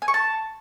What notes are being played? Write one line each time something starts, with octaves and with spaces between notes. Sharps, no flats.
G#5
C#6
A5